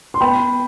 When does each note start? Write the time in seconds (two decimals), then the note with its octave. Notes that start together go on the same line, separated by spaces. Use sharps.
0.14 C6
0.20 B3 G5 B5